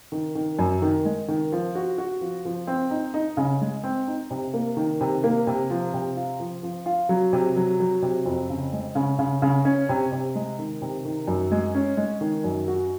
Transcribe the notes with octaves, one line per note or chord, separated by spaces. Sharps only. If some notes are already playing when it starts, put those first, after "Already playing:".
D#3
D#3
F#2
D#3
G#3
D#3
F3
F#4
F#4
F3
F3
C4
D#4
D#4
C#3
G#3
C4
D#4
C3
A#3
D#3
C3
A#3
C3
F3
C3
F4
F3
F3
F4
F#3
C3
F#3
F#3
C3
F2
C#3
G#3
C#3
C#3
C#3
C#4
C3
C3
G#3
D#3
C3
D#3
F#2
G#3
C#4
G#3
D#3
F#2
F#4